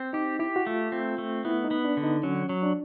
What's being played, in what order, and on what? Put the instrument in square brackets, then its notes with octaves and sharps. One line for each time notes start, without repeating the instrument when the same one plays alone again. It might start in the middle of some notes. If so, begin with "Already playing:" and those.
Already playing: [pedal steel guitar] C4
[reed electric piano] D#4 [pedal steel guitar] G4
[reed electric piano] E4 [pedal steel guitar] G4
[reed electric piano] F#4
[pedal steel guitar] A3 [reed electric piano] F4
[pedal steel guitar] C4
A3
[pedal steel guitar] B3 [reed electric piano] E4
[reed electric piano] D#4
[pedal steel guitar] B3
[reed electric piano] D4
[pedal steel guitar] D3
[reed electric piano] D#4
[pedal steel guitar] F#3 [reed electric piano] C#4
[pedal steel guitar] F#3
[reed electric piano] D4